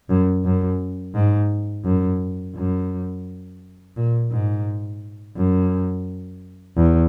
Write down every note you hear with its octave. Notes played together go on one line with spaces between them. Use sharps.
F#2
F#2
G#2
F#2
F#2
A#2
G#2
F#2
E2